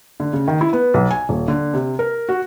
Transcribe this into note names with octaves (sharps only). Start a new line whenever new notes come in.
D3
C#3
D#3
E4
B3
B1
G#5
D#1
D3
C3
A#4
F#4